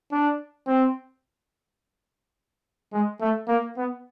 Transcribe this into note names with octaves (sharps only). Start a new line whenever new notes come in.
D4
C4
G#3
A3
A#3
B3